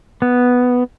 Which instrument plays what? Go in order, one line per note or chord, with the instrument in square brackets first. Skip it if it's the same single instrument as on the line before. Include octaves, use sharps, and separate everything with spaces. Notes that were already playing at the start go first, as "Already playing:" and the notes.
[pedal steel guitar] B3